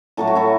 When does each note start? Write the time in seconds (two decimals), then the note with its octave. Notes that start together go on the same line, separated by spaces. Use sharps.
0.17 A2 F#3 A3 A4
0.27 F#4
0.35 E4 A4